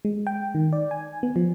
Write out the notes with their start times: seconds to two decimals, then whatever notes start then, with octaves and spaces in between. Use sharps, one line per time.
0.05 G#3
0.27 G5
0.55 D#3
0.73 D5
0.91 G#5
1.23 B3
1.36 F3